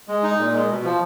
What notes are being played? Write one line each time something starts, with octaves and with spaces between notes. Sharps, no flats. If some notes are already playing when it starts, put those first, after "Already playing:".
G#3
D#4
A#2
G#3
B2
F3